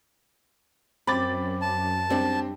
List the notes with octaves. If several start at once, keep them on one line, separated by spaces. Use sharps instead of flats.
F#2 C4 B5 D6 A6
A5
G3 C4 D4